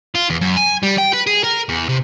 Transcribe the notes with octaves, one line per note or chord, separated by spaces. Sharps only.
F4
E2
F#2
G#5
G3
G5
B4
G#4
A#4
E2
C3